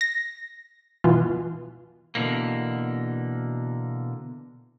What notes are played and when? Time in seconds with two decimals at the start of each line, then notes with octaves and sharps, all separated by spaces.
0.01 A#6
1.04 B2 E3 F4
2.15 B2 D3 E3 A#3